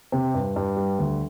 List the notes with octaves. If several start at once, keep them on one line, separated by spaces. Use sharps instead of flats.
C3
G2
G2
G3
D2